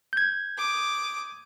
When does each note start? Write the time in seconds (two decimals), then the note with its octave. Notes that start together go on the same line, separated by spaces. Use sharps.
0.13 G6 G#6
0.58 D6 D#6